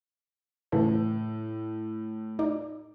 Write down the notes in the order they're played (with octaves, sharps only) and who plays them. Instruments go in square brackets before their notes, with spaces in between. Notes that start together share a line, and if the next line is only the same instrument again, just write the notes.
[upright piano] A2 [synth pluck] C#3 E3 A4
[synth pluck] D#4 D5